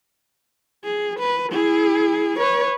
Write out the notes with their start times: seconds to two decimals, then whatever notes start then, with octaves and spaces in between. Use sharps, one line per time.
0.84 G#4
1.20 B4
1.51 E4 G#4
2.40 B4 C#5